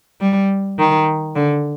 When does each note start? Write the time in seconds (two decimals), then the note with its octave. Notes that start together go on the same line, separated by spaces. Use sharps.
0.21 G3
0.79 D#3
1.36 D3